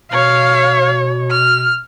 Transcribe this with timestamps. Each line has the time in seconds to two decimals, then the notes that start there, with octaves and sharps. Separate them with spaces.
0.11 B2 C#5 F5
1.30 F6